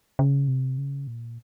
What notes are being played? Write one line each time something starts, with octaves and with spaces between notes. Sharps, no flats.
C#3
C3
C#3
A#2